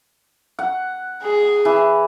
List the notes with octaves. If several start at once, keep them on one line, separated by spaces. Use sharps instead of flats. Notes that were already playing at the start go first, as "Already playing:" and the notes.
F#5
G#4
E3